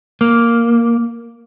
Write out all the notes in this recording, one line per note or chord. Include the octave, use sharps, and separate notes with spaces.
A#3